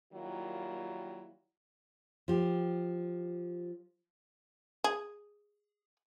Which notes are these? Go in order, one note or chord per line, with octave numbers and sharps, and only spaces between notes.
D#3 F#3 G3 A#3 E4 F4
F3 G4
G#4